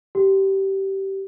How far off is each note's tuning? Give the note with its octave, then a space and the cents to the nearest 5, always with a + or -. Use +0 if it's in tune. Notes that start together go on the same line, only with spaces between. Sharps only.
G4 -20